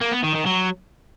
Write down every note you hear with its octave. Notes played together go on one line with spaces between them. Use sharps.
A#3
B3
D#3
D#3
F#3